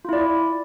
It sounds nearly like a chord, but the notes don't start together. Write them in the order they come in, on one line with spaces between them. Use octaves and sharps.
F4 E4 D5